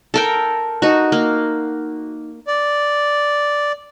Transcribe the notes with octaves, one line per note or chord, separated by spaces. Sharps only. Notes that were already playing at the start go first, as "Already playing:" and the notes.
A4 A#4 G5
D#4 F#4
A#3
D5